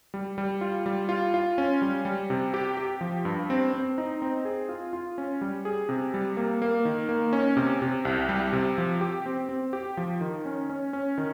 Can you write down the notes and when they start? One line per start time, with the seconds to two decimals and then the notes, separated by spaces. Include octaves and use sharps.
0.14 G3
0.38 G3
0.61 F4
0.86 G3
1.09 F4
1.34 F4
1.58 C#4
1.82 G3
2.05 G3
2.30 C3
2.54 G4
2.77 G4
3.01 F3
3.25 G2
3.50 C4
3.73 C4
3.98 D#4
4.22 C4
4.45 G#4
4.69 F4
4.93 F4
5.18 C#4
5.41 G3
5.65 G#4
5.89 C3
6.14 G3
6.37 A#3
6.62 A#3
6.85 D#3
7.09 A#3
7.33 C#4
7.57 C3
7.82 C3
8.05 C2
8.29 G3
8.53 C3
8.78 F3
9.01 G4
9.26 C4
9.49 C4
9.73 G4
9.97 F3
10.21 D#3
10.45 C#4
10.69 C#4
10.93 C#4
11.18 D#3